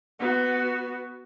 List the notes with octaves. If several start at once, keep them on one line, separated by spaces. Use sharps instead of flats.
B3 F#4